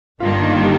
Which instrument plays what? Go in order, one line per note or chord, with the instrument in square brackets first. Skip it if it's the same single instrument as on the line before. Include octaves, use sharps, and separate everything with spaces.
[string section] G1 G2 D#3 A#3 D4 [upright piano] F4
[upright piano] D#4
F4
G4